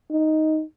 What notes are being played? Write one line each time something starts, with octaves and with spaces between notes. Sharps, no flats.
D#4